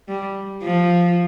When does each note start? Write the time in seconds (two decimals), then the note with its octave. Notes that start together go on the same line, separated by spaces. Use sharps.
0.08 G3
0.63 F3